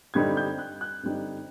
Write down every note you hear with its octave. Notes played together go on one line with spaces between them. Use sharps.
G2 D3 G3 C4 D#4 G#6
G6
F#6
F#6
G2 D3 G3 C4 D#4